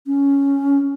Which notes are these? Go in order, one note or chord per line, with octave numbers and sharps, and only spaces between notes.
C#4